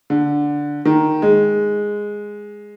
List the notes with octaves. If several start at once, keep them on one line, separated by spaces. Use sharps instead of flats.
D3
D#3
G#3